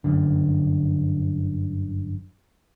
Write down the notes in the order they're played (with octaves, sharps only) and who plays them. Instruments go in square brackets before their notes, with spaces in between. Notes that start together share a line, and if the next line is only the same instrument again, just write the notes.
[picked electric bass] G1 F#2 D3